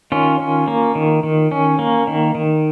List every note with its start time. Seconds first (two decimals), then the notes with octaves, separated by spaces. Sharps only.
0.12 D#3 C#4 F4
0.40 C#4
0.68 A#3
0.95 D#3
1.23 D#3
1.52 C#4
1.79 A#3
2.07 D#3
2.35 D#3